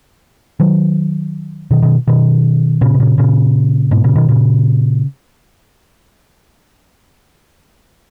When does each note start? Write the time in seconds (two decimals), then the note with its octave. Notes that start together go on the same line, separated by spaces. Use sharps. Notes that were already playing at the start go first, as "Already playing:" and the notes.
0.60 D#3 F#3
1.71 B2 D#3
1.82 B2 D#3
2.08 B2 D#3
2.81 A#2 C#3
2.94 B2
3.00 A#2 C#3
3.18 A#2 C#3
3.91 G#2 B2
4.04 A#2 C#3
4.16 B2 D#3
4.29 A#2 C#3